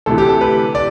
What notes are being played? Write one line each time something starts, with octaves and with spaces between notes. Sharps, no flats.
D2 C3 E3 A4
G4
A4
B4
D5